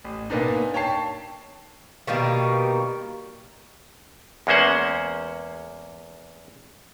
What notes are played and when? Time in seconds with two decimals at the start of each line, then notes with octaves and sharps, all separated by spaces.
0.04 A1
0.30 A#2 A#3 B3 D4 D#4
0.74 C#5 G5 A5 C7
2.07 B2 D#3 G3 A#3
4.47 E2 G#3 A#3 C#4 C5 F#5